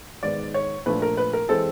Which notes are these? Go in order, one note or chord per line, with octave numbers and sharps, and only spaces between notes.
G#2 D#3 G#3 B3 D5
C#5
A#2 F3 A3 D4 B4
A#4
B4
A#4
E3 G#3 C4 A4